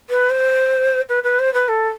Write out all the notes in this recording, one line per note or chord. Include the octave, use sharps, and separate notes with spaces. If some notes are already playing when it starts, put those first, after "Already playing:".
B4
C5
B4
B4
C5
B4
A4